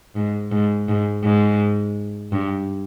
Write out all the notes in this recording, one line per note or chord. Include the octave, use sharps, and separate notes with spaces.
G#2
G#2
G#2
G#2
G2